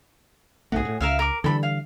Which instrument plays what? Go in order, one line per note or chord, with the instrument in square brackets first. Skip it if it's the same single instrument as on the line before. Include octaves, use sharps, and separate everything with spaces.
[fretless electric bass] B1 G#2 A3 [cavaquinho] F#4 G#4
[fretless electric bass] A2
[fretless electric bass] C#2 [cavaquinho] A#4 E5 F5
[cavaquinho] A#4 D6
[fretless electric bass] D3 E3 G3 [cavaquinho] A4 B5
[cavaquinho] F5